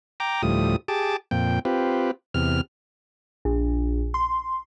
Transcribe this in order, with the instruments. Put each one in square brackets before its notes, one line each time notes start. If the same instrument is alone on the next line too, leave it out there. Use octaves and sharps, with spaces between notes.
[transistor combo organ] G5 A#5 D6
D2 A2 F3 G3 D#6
G4 G#4 A5 D6
F2 A#2 G5
C4 F4 G4 B4
E2 C3 F6
[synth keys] A#1
C6